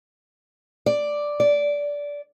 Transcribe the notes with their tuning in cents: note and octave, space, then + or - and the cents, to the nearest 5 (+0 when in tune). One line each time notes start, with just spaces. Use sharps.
D5 +0
D5 -15